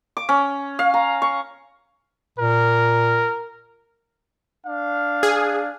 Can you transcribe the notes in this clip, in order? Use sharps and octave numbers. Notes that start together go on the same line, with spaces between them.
D6
C#4
F5
A#5
C#6
A#2 A#4
D4 F5
G#4